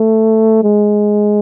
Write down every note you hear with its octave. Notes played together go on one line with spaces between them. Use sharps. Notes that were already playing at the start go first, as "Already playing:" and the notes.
Already playing: A3
G#3